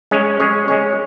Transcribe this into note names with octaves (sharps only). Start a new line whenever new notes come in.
G#3 C#4 G#4 C#5
G#3 C#4 G#4 C#5
G#3 C#4 G#4 C#5